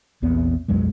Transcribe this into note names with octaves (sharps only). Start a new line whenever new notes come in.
A#1 E2 B3 C4
B1 F2 F#3 G#3